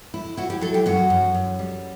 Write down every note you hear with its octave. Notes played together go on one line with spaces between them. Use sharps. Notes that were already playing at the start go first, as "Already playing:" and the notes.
E4
E4 F#4
G4
F#3 A4
G4
F#2 F#4
F#2
F#2
G3